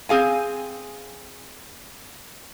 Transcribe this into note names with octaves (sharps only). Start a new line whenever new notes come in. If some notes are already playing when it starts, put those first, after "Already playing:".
C4 G#4 F5 G#5